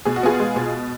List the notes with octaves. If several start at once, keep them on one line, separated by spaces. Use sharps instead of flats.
B2 G#4
F#4
B3 F4 G#4
G#3
B2